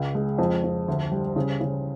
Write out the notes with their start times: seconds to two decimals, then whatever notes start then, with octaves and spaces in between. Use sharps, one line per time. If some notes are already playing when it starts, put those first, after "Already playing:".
Already playing: C#2
0.15 G#3
0.38 F2
0.64 F2
0.88 D2
1.12 G3
1.36 C#3
1.61 C#3